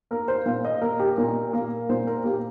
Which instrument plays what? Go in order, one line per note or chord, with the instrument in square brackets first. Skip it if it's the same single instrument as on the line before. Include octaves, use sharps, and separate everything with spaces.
[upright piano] A#3 A#4
C5
A#2 F5
D#5
A#3 A#4
G4
A#2 A#4
A#3
A#2 C5
A#4
A#3 G4